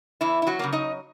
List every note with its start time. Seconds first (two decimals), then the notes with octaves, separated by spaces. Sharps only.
0.21 E2 E3 E4
0.42 E4
0.47 F#3 F#4
0.59 C#3 F#3 A#3
0.72 D#4 D#5